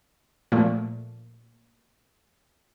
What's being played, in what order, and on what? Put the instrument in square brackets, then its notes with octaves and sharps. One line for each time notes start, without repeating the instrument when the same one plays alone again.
[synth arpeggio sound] A#2 F3 A3